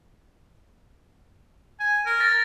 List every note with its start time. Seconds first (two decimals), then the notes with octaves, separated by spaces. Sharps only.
1.80 G#5
2.06 A#4
2.20 A6 A#6